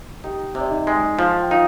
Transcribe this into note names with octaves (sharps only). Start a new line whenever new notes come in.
D#4 G4 G5
C3
D5
D#4 D#5
G#3
F3
G5
D#4 F4 F5